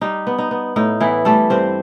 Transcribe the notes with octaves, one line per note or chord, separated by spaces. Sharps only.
G3 D#4
B3
D#4
B3
A2 D#4
E3 B3 E4
G3 A3 A4
G2 C4 C5